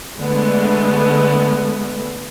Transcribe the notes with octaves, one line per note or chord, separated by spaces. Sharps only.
D3 G#3 A3 B3